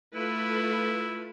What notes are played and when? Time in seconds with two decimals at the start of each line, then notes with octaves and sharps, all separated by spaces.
0.14 A3 E4 F4 B4